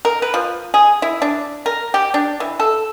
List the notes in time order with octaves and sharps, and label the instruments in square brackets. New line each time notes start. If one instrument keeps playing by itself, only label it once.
[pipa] A#4
B4
F3
G#4
E4
D4
A#4
G4
D4
E3
A4